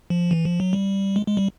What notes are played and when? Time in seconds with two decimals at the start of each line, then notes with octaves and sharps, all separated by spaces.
0.10 F3
0.31 E3
0.45 F3
0.60 F#3
0.73 G3
1.16 G#3
1.27 G#3
1.37 G3